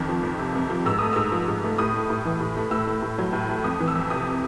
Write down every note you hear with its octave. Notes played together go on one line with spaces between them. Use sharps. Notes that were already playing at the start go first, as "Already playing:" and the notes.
Already playing: F2 D#3
F3
F2
C3
F2
F3
G#2 E6
A3 D#6
G#2 E6
F3
G#2
A3
A2 D#6
A3
A2
E3
A2
A3
A2 E6
A3
A2
F#3
A2
A3
F2 D#6
E3
E6
F2
C3 D#6